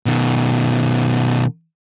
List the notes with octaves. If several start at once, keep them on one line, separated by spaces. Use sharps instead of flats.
B2 D#3